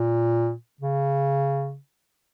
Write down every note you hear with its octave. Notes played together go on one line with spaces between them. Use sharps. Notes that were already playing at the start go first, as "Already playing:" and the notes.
Already playing: A#2
C#3